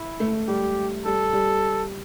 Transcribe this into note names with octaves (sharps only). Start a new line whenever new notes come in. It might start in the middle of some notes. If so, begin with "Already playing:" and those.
Already playing: E4
A3
G3 G4
G3 A4
G3